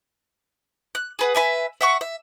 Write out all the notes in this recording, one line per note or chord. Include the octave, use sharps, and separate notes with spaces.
F#6
G#4 B4 F#5
B4 E5 G#5
E5 F#5 C#6
E5